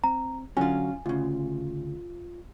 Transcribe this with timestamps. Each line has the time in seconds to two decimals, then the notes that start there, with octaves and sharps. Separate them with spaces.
0.04 C4 A#5
0.57 D3 F#3 C#4 F4 F#4 G#5
1.06 D2 C#3 F4